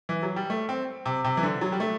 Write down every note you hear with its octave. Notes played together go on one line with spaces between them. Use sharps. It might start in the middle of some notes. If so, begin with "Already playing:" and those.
E3
F#3
G3
A3
C4
C3
C3
E3
D3
F#3
G3
A3